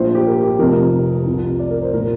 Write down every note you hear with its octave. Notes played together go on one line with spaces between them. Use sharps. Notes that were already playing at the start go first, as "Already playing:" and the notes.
Already playing: A#1 A#2 F3 C5
G4
A#4
G4
F1 F2 C3 F3 A#4
C2 C3 F3
D5
A#4
C5
A#2 F3 A#4